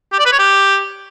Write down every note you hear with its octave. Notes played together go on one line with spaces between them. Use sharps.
G4
D5
B4
C#5
G4